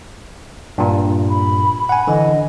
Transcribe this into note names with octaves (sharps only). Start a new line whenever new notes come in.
G2 A#2
B5
F#5 G#5
D3 E3 D#5